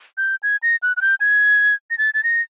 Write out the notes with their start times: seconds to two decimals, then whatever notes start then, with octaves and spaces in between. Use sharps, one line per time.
0.18 G6
0.43 G#6
0.63 A#6
0.83 F#6
0.97 F#6
1.02 G6
1.20 G#6
1.90 A#6
1.98 A6
2.14 A6
2.24 A#6